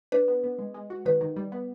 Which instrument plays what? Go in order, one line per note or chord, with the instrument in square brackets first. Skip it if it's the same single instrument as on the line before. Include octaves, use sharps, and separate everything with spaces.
[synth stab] D4 [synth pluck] B4
[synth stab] B3
B3
G#3
G#3
F#4
[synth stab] D#3 [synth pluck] B4
[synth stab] D#3
G3
B3